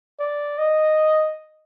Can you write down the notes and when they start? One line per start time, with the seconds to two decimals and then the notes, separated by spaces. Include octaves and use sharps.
0.20 D5
0.59 D#5